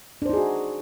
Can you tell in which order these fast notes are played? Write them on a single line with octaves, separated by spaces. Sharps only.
D4 C5 D#4 G#4 F#4